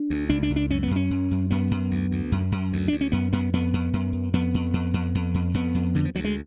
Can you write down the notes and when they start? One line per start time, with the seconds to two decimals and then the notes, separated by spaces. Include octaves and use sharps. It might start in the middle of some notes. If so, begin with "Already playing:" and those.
Already playing: D4
0.10 D2
0.29 C#2 D4
0.43 D4
0.50 C#2
0.56 D4
0.70 F#2 C#4
0.83 B3
0.91 F#2 C#4
1.10 F#2
1.31 F#2
1.51 F#2 B3
1.71 F#2
1.91 D2
2.11 D2
2.32 F#2
2.52 F#2
2.73 D2
2.88 D2 D4
3.01 C#4
3.12 F#2 B3
3.33 F#2 B3
3.53 F2 B3
3.73 F2
3.93 F#2
4.13 F#2
4.33 F2 B3
4.54 F2
4.73 F2
4.94 F2
5.15 F2
5.34 F2
5.54 F2 B3
5.74 F2
5.95 D2 D3
6.05 F3
6.15 D2 F#3
6.24 G#3